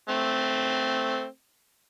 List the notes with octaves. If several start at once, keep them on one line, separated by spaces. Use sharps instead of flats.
A3 C4